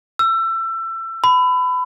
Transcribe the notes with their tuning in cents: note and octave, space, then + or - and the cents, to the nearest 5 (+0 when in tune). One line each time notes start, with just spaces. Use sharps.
E6 +25
B5 +25